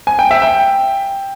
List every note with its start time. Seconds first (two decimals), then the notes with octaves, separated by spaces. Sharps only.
0.07 G#5
0.19 G5
0.31 E5
0.42 G5